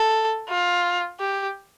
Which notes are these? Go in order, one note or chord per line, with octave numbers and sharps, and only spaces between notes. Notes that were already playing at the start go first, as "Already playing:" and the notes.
Already playing: A4
F4
G4